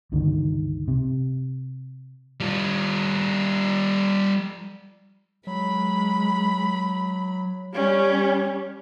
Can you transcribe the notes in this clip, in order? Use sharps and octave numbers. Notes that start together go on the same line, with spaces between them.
G1 C#2 D3 D#3
C3
G3 F4
F#3 G#3 B5
G3 C#4